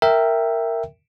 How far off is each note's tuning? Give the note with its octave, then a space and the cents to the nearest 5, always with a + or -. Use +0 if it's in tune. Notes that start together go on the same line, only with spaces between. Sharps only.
A#4 -10 E5 +0 G5 +0